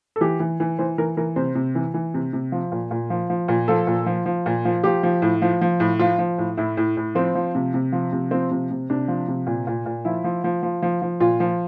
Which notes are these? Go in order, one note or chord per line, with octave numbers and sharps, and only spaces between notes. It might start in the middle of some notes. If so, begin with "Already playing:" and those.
A4
E3 G4
E3
E3
E3 C5
E3 A#4
E3 A#4
C3 C5
C3
E3
E3
C3
C3
F3
A#2
A#2
F3
F3
A#2
F3 A4
A#2
F3
F3
A#2
F3
F3 G4
F3
A2
F3
F3
A2
F3 F4
F3
A2
A2 E4
A2
A2
F3 C4
F3
C3
C3
F3
C3
F3 C4
C3
C3
C3 D4
F3
C3
A#2
A#2
A#2
F3 E4
F3
F3
F3
F3
F3
A#2 F4
F3